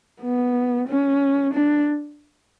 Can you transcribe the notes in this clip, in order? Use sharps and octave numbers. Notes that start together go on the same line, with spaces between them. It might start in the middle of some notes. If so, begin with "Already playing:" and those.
B3
C#4
D4